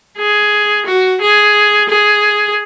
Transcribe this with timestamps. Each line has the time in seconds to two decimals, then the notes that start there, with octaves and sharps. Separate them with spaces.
0.18 G#4
0.86 F#4
1.21 G#4
1.89 G#4